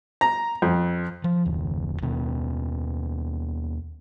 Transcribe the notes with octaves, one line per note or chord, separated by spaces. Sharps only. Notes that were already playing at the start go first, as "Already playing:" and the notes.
A#5
F2
F3
F#1 D#2
D#2 B2 B3